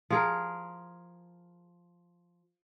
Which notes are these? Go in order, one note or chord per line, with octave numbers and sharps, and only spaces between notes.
F3 G#4 A#4